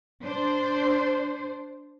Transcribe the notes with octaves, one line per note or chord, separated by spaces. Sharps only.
D4 C5